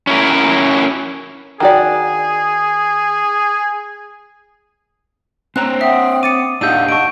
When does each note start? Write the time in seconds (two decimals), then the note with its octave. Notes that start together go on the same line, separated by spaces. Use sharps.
0.07 C#4 E4 A#4
1.60 D#3 F#4 G#4 D5
5.56 C4 C5 C#5 A#5 F#6
5.81 E5 F#5 G5 D#6
6.23 D6 D#6 A6 C#7 D#7
6.61 D4 D#4 G4 F5 F#5 E6 G6 D#7
6.89 D#5 F#5 A5 C#6 D7